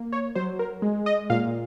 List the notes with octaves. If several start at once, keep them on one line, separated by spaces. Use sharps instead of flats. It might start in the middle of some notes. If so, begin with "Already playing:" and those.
Already playing: A#3
C#5
F#3 C5
A#4
G#3
D#5
A#2 F5